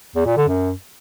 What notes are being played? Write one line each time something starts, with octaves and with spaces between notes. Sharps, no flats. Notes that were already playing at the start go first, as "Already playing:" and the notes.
E2
A#2
D3
F#2